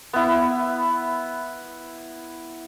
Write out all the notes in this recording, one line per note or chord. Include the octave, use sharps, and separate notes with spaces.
B3 E4